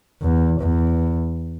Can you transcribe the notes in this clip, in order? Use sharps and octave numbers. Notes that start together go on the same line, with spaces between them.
E2
E2